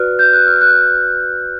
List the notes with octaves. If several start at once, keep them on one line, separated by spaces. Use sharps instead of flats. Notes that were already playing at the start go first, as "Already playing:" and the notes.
Already playing: F#4 B4 D5 F6 F#6
G6
F#6
F6
F#6